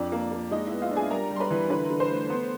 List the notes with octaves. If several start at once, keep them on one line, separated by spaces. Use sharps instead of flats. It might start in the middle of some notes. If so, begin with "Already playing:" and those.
Already playing: F2 D4 D5
A#3
A#3
G#3 D#4 D#5
B3 E4 E5
F4 F5
D4
G#4 G#5
G3 A#4 A#5
G3
C6
B4 B5
E3
D3 B4 B5
D3
C5 C6
A3
B3